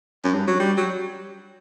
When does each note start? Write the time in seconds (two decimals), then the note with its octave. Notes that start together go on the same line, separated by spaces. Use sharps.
0.24 F#2
0.35 G2
0.47 F#3
0.59 G3
0.77 F#3